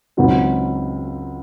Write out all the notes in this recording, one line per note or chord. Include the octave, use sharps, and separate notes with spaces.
C#2 C#3 F#3 C4 D#4